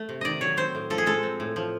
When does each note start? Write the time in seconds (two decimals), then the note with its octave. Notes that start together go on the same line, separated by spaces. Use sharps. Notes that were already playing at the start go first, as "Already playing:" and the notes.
Already playing: A3
0.09 C3
0.21 D#3 D5 D#5
0.41 F#3 C#5
0.57 C4 C5
0.75 A2
0.90 F3 A4
0.98 G#4
1.06 G#3 A4
1.23 C4
1.40 A2
1.56 F3